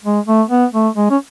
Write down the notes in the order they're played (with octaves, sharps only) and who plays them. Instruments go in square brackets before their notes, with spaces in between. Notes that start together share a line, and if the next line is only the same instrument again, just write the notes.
[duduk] G#3
A3
B3
A3
G#3
C#4